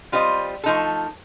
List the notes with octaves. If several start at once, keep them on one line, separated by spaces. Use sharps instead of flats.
G3 C4 F4 C5 D#5
F3 A3 D#4 A4